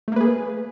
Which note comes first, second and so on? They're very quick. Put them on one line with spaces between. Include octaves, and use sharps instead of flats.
A3 A#3 B4 G#4